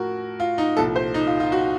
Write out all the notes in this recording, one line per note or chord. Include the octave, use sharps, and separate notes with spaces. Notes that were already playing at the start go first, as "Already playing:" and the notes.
Already playing: A2 F3 F#4 A#4
F4
D#4
C2 A#2 F3 A4
C5
D#4
F4
F4
F#4